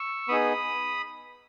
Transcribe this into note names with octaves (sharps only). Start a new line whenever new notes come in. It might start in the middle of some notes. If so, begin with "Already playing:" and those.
Already playing: C#6 E6
B3 D#4 G#4 B5 D#6